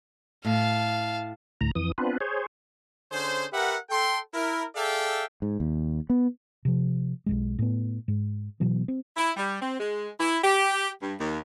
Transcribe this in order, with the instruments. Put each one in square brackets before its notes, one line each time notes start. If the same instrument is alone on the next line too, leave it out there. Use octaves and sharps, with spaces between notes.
[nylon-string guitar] A2 [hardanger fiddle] F5 A5
[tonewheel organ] D2 A2 A#5
F2 E3 D#6
B3 C4 D4 F4 B4
G#4 C5 C#5
[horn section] D3 C#4 G#4 C5
G4 A#4 B4 E5 F#5
A4 G5 C6
E4 A#4
G#4 A4 D5 E5 F5 G5
[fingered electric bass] G#2
D#2
B3
C3 F3
B1 E2 G#3
A2 B3
G#2
B2 E3 F#3 B3
C4
[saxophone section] E4
G3
C4
G#3
E4
G4
G2
D#2